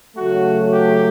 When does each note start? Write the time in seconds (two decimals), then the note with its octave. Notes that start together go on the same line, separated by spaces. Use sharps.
0.17 C#3 F#3 A3 F#4
0.73 G4